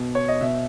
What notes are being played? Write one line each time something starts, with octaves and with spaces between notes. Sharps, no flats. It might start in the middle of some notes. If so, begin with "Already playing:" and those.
Already playing: B2
C#5
D#5
B2 E5